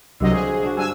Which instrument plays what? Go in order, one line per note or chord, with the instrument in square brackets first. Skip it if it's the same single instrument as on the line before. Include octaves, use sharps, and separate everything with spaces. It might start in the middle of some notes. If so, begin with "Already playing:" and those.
[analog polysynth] C2 F#3 D#5 [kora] D3 C5
[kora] F4 F#4 C5 [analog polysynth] G#4
[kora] D4 F#4
[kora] G2 D4 [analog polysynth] G#5 E6